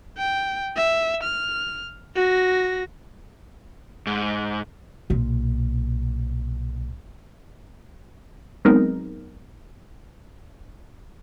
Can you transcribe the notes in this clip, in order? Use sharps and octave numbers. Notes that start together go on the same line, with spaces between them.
G5
E5
F6
F#4 A#6
G#2
B1 A#2
F#3 G#3 B3 C4 D#4 A#4